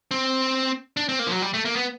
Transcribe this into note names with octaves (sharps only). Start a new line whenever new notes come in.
C4
D4
C4
A#3
F3
F#3
G3
A3
A#3
B3